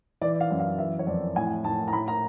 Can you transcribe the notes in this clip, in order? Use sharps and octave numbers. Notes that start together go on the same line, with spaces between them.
E3 D5
F5
F#2
F5
E3 E5
C#5
F2 D5
A2 G#5
A2 A5
A#5
A2 B5
A#5